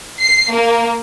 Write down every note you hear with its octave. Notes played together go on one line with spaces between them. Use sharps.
C7
A#3